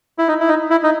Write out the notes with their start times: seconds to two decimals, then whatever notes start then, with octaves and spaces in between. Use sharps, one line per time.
0.18 E4
0.28 D#4
0.40 E4
0.48 D#4
0.70 E4
0.84 D#4